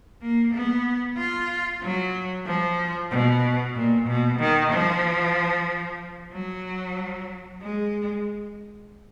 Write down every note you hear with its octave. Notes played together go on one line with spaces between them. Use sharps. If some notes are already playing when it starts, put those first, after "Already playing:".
A#3
B3
F4
F#3
F3
B2
A#2
B2
D#3
F3
F#3
G#3